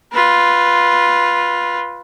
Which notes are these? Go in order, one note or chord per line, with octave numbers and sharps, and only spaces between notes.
F4 B4